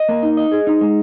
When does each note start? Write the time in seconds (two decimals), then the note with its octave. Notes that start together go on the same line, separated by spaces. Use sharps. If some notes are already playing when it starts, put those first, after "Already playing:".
Already playing: D#5
0.09 A#3
0.23 D#4
0.37 D#5
0.52 G#4
0.67 D#4
0.81 G#3